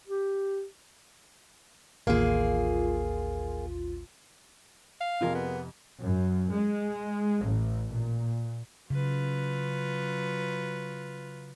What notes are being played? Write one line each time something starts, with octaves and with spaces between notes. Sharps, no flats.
G4
A1 D#2 A#3 F4 G#4
F5
F2 C3 F4 G#4 A#4
B3
F#2
G#3
A1
A#2
C#3 F#3 F4 B4